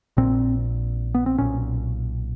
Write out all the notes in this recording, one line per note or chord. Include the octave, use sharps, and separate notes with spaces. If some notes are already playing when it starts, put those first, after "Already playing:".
A#1 A#2 C4
B3
C4
B1 A#2 C#4